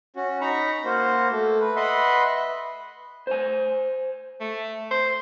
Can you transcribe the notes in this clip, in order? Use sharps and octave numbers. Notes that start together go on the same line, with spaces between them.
C#4 F#4
D#4 A#5 B5 C#6
A#3 F#4 C5
A3
B4
B4 D#5 E5 F#5 B5 C6
C5 G#5
A3
C5